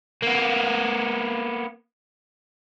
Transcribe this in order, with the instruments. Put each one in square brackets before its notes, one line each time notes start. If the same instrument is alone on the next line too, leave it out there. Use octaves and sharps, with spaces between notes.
[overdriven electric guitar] A#3 B3